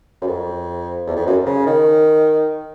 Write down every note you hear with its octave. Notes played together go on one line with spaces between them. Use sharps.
F#2
F2
E2
F2
F#2
C#3
D#3